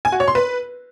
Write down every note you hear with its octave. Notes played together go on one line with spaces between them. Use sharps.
G#5
F#4
C#5
C6
B4